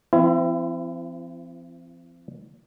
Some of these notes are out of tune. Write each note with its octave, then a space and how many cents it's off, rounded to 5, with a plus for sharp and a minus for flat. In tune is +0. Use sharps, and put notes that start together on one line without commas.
F3 -45 C4 -25 E4 +30